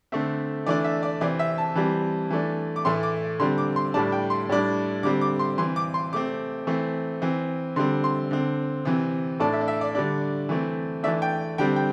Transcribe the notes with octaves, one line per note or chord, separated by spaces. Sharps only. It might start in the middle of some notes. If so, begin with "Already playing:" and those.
D3 A3 C4 E5
E3 A3 D4 D5
E5
D5
C3 E3 C4 D5
E5
A5
E3 G3 C4
E3 A3 D4
D6
A2 E3 A3 C6
D6
D3 G3 C4 C6
D6
C6
A2 G3 D4 A5
G5
C6
A2 G3 D4
D3 G3 C4 D6
D6
C6
E3 C4 C6
D6
C6
C3 A3 C4 D6
E3 A3 C4
E3 C4
D3 G3 C4 C6
C6
D3 C4
C3 E3 C4
A2 A3 D4 A5
E5
D5
E5
D5
D3 G3 D4
E3 A3 C4
E3 A3 D4 E5
G5
D3 G3 C4 G5
G5